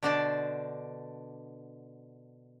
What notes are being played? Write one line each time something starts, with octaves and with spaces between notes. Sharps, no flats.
B2 D3 D4 C5 D5 A5